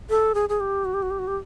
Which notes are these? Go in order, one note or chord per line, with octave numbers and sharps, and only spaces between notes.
A4
G#4
G#4
G4
F#4
G4
F#4
G4
F#4
G4